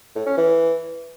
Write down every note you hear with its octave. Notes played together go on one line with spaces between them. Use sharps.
A2
C#4
E3